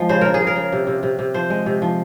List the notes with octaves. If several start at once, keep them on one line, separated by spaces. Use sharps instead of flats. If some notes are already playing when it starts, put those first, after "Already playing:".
Already playing: F3 G#3
C#3 C5
C#3 A#4
G#4
C#3
A#4
C#3
C3
C3
C3
C3
F3 C5
G#3
C3
F3